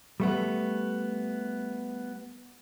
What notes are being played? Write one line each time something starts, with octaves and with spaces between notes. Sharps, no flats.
G3 A3 B3